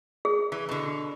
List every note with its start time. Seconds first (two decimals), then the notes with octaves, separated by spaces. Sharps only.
0.25 G#4
0.52 E3
0.69 B2 D3